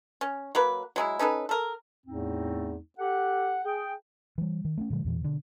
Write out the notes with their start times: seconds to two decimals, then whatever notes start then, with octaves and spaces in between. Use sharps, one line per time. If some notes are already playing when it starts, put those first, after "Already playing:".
0.21 C#4
0.55 F#3 A#3 B4
0.96 F#3 G#3 E4
1.19 C#4 D#4 A4 B4
1.49 A4 A#4
2.07 E2 A2 A3 C4 D#4
2.99 G4 A4 F#5
3.65 G#4 G5
4.38 E3 G3
4.65 D#3
4.78 A3 C4 C#4
4.90 A#2 D3 F3 G#3
5.04 E2 A#2 E3
5.21 B2 D3